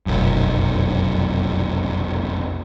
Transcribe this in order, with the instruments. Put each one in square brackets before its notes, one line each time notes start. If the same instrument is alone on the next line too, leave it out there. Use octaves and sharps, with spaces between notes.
[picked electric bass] F1 B1 F#2